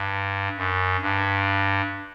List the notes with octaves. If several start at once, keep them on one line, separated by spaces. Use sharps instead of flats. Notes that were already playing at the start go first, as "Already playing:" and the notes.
Already playing: G2
F#2
G2